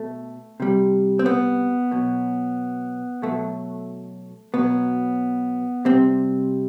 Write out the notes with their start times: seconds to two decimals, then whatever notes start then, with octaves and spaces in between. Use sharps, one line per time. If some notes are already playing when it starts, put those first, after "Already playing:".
Already playing: B2 A3
0.60 C3 G3
1.19 C4
1.26 B3
1.91 B2 F#3
3.22 B2 F#3 A3
4.54 B2 F#3 B3
5.85 C3 G3 C4